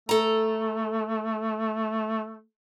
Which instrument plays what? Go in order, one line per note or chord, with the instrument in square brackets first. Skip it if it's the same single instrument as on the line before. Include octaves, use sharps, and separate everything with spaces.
[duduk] A3 [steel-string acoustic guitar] A4 A#5